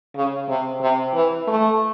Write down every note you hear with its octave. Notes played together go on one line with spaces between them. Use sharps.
C#3
C3
C3
E3
A3